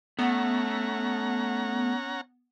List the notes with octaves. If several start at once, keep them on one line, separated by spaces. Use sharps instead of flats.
A3 B3 C#4 F#5 A#5